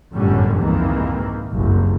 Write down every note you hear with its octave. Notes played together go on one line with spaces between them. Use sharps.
G1 F#2 A2 D3 G3 C#4
C2 F2 G#2 D#3 E3 A#3
F#1 C2 G2